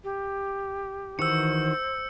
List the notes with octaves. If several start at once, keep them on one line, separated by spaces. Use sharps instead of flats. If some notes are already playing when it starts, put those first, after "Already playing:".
G4
D#3 E3 F#4 C5 E6 C#7